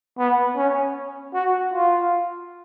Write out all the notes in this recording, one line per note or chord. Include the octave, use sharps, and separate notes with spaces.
B3
C#4
F#4
F4